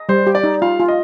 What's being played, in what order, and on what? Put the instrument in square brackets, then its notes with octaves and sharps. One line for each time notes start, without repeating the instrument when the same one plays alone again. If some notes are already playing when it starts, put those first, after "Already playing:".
Already playing: [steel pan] D#5
[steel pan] G3 [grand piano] C5
[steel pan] G4
[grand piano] D5
[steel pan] D#4
[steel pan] F4 [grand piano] F5
[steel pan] F4
[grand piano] D#5